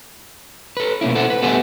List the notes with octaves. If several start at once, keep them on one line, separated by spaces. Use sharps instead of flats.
A4 B4
B2 A#3 C#4 E4
A4 C5 F#5
B4
A3 B3 G4 A4 F#5 G#5